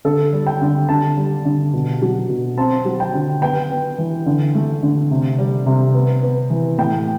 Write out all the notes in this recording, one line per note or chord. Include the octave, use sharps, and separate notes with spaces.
D3 A4
G3
G5
D3
D3 A5
G3
D3
B2
F#3
B2
C4 A5
F#3
G5
D3
B3 G5
B3
E3
D3
A3
D3
C3
G3
C3
B3
B3
E3
A2 G5